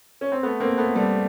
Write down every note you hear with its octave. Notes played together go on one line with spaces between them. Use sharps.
C#4
C4
A3 B3
A#3 C4
A3 B3
G3 A3